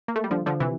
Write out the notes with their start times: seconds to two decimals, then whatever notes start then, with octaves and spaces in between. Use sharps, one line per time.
0.08 A#3
0.16 A3
0.24 G3
0.31 D3 F3
0.46 D3 F3
0.60 C3 E3